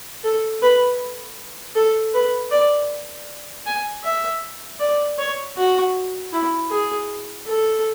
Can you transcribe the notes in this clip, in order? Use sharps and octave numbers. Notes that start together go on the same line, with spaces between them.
A4
B4
A4
B4
D5
G#5
E5
D5
C#5
F#4
E4
G#4
A4